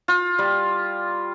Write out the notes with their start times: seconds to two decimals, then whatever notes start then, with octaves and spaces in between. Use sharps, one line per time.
0.08 F4
0.39 G3